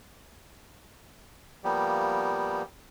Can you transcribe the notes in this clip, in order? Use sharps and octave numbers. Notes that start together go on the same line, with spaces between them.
F3 G3 A#3 B3 G4